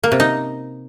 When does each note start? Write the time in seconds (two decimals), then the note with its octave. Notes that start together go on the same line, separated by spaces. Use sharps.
0.03 A#3
0.12 C3
0.20 D#4